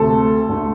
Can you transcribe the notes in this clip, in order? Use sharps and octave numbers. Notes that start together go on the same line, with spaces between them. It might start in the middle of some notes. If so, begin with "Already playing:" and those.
Already playing: D2 C3 A3 A4
D2 D3 A3